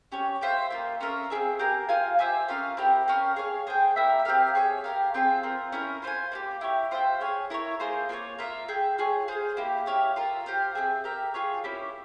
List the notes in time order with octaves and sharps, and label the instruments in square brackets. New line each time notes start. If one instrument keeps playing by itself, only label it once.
[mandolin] C#4 G4 C#5
F4 C5 E5 G5
A#3 F4 A#4
C#4 F4 A#4 E5
E4 G#4 E5
C4
G4 A#4 F5 G#5
F4 A#4 F5 G#5
G4 C5 E5 G#5
C#4 F4 A#4 F5
C4 E4 G4 A#4
C#4 G4 A#4 F5
G#4 C#5 F5
G#4 C5 G5
A#3 E4 A#4 E5
C4 G4 A#4 F5
G#4 C#5 E5 G#5
G4 A#4 F5
C4 F4 G#4 E5
C4 F4 A#4
C#4 E4 A#4
F4 C5 F5 G#5
A#3 E4 G4
E4 G4 C#5
F4 C5 E5 G5
G#4 C#5 F5 G#5
E4 A#4 C#5
A#3 F4 G#4 C5
A#3 F4 A#4 C#5
F4 A#4 E5
G#4 E5 G5
F4 G#4 C#5
G#4 C5 F5 G#5
A#3 E4 G4
E4 G4 C#5 F5
F4 A#4 E5
G4 C5 F5
C4 E4 G#4 E5
G4 A#4 E5
F4 G#4 C#5
A#3 C#4 E4 G4